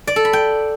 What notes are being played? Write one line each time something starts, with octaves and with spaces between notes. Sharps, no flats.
D5
A4
B5
G5